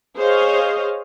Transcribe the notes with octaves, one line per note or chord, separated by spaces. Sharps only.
G#4 C5 C#5 D#5 F5